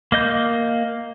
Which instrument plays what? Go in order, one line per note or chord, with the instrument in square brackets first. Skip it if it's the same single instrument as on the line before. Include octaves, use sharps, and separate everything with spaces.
[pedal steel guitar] A#3 D#5 G6